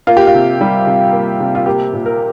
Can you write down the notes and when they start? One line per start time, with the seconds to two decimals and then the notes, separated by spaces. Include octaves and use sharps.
0.07 A#3 F4
0.17 G4
0.27 F4
0.34 C3
0.61 G3
0.87 C3
1.13 A#3
1.40 C3
1.55 F4
1.66 A#3 G4
1.93 A#2
2.06 A#4